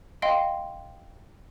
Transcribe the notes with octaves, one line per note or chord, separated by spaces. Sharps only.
D#5 F5 G5 C6